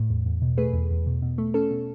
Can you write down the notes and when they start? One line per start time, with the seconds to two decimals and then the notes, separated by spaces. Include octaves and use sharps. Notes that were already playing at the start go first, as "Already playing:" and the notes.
Already playing: A2
0.10 E2
0.26 E2
0.42 B2
0.57 A3 G#4 B4
0.74 E2
0.91 E2
1.06 B2
1.22 B2
1.38 A3
1.54 C#4 A4
1.71 B2